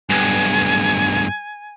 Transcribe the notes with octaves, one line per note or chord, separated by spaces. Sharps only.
B1 G2 G#5